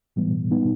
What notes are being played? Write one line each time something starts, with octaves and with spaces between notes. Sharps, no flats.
A2 E3 G3 B3
G3 B3 D#4